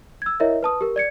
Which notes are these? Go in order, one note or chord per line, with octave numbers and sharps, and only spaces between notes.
E6 G#6
E4 A#4 C#5 D#5 E5
B4 A5 D#6
G4 A#4
D5 G#6 C#7